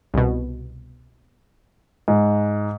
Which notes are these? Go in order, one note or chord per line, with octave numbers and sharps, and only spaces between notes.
C2 B2
G#2